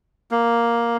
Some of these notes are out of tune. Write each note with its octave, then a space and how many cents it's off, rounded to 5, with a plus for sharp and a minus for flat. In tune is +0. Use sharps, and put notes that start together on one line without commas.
A#3 +5